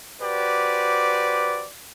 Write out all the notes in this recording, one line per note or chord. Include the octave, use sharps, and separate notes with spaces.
F#4 G4 B4 C5 D5